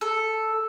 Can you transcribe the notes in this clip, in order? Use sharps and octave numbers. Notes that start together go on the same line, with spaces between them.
A4